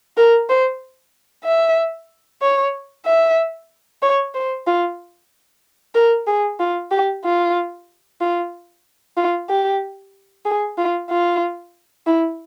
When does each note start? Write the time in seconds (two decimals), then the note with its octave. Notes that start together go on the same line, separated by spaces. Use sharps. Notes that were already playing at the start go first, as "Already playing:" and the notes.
0.17 A#4
0.49 C5
1.45 E5
2.42 C#5
3.06 E5
4.03 C#5
4.35 C5
4.67 F4
5.95 A#4
6.27 G#4
6.60 F4
6.91 G4
7.24 F4
8.21 F4
9.17 F4
9.50 G4
10.45 G#4
10.78 F4
11.10 F4
12.06 E4